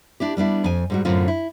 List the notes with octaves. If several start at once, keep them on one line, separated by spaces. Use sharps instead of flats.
D4 E4 G4
G3 B3 D4 E4
F2 G#5
G#2 G3 F#4
F#2 A2 D3 C4 F4
E4